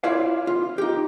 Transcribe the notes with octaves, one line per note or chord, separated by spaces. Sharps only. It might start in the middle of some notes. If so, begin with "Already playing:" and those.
E4 F4 C#5 D5 E5 F5
F4
D#4 G4